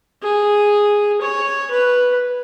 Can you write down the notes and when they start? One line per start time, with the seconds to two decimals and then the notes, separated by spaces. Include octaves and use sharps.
0.23 G#4
1.22 C#5
1.71 B4